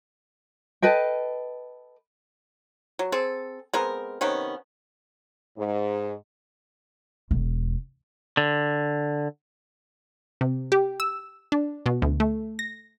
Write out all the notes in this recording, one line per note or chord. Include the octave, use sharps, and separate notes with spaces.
A4 B4 D#5 G5
F#3
C4 G#4 A4
G#3 B3 C4 A#4
C3 D#3 B3 C#4
G#2
E1
D3
C3
G4
E6
D4
B2
D2
A3
A#6